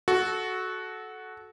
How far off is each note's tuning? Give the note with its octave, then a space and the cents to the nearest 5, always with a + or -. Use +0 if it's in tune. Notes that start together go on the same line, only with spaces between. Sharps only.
F#4 +0 A4 -20